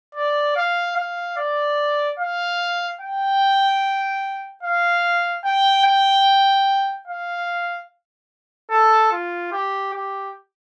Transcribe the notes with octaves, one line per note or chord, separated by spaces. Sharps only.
D5
F5
F5
D5
F5
G5
F5
G5
G5
F5
A4
F4
G4
G4